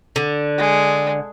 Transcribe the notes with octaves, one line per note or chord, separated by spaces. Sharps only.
D3
G#3